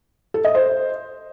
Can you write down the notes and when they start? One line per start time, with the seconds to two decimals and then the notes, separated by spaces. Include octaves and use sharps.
0.34 A4
0.45 D#5
0.55 C5